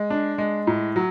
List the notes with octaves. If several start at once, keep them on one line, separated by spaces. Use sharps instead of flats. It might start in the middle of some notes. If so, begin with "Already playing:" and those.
Already playing: G#3
D4
G#3
A2
F#3